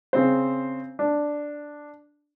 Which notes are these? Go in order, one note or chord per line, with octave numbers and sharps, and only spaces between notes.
C#3 C4 C5
D4